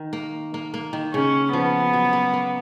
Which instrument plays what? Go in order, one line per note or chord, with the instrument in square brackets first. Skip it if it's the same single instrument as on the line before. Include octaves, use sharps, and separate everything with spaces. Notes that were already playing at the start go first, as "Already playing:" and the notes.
Already playing: [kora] D#3
A#3
A#3
A#3
D#3
[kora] C#3 [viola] C#4
[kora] F3 [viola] B3
[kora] F#3
A#3
A#3